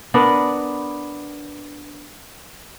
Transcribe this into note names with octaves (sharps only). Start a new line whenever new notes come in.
B3 D4 A#4 B4